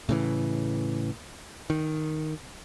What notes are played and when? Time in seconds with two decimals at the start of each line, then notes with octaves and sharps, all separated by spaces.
0.09 A2 C#3 E3
1.70 D#3